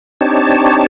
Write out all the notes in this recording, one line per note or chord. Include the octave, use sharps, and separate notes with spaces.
C4 D4 D#4 G4 C#5 A5